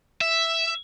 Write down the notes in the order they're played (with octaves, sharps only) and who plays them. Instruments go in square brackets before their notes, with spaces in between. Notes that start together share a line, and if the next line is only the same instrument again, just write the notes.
[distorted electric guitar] E5